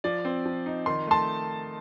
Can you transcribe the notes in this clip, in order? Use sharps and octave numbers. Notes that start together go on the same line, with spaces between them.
F3 D5
C4
F3
D#4
D#3 C6
A3 A5 C6